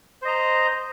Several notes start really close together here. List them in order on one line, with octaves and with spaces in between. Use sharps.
C5 D#5 A#5